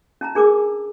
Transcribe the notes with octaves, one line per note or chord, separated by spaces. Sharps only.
C#4 A5 A#5
D4 G#4 A#4 D6